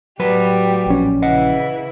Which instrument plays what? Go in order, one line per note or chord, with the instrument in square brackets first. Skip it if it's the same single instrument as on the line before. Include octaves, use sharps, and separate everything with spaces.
[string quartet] A2 G3 G4 [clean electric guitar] F#3 F#4 B4
[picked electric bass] A#1 C#4
[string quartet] C#3 E3 E4 [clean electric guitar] D#5 F#5